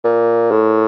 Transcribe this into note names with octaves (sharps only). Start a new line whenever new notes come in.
A#2
A2